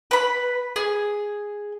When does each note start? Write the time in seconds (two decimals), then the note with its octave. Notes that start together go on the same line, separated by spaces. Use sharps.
0.11 B4 B5
0.76 G#4